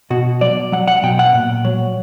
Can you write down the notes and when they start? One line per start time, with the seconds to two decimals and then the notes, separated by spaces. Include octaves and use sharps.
0.10 B2 F#4
0.41 F#3 D5
0.72 F#3 F#5
0.88 F#5
1.03 B2 G5
1.19 F#5
1.34 A#2
1.65 F#3